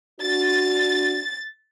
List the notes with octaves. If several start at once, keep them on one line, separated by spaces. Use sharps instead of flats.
D4 F#4 A6